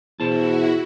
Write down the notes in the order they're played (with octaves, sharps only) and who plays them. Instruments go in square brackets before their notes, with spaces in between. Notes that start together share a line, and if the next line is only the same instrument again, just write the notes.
[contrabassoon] E2 [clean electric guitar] B2 C5 A5 [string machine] E4 F#4